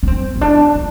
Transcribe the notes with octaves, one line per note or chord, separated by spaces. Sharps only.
D4
C4
C4
D4
D4